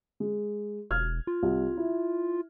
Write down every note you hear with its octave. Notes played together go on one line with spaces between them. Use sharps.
G#3
E1 F6 G#6
F4
C2
E4